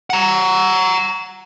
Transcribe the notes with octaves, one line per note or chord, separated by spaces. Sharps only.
F#5 A#5